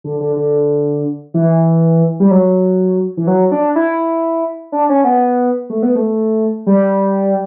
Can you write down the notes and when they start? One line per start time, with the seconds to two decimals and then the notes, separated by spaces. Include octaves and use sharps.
0.04 D3
0.20 D3
0.37 D3
1.34 E3
2.20 G3
2.31 F#3
3.17 E3
3.27 F#3
3.52 D4
3.76 E4
4.72 D4
4.89 C#4
5.04 B3
5.70 A3
5.83 B3
5.95 A3
6.67 G3